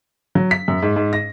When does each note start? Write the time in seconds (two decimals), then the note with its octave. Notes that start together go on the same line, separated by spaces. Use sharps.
0.35 F#3
0.51 B6
0.68 F#2
0.82 G#2
0.96 G#2
1.13 A#6